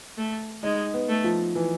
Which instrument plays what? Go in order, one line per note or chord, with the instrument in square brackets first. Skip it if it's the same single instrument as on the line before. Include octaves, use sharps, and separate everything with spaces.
[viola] A3
[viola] G#3 [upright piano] D#4
[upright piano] B3
[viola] A3
[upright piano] F3
E3